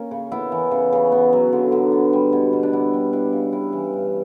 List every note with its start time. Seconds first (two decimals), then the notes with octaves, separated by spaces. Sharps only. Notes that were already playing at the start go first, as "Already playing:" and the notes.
Already playing: A#3 C#4 A#4
0.11 C#3
0.32 B3 E4
0.52 E3
0.71 C#3
0.93 C#3
1.12 B3
1.33 F#3
1.52 D3
1.72 D3
1.92 B3
2.13 G3
2.32 B2
2.53 B2
2.63 D4
2.73 B3 E4
2.93 G3
3.13 D4 E4
3.33 C#3
3.53 G3 E4
3.73 E3
3.93 G2